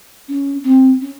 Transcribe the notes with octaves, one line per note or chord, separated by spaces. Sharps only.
C#4
C4
C#4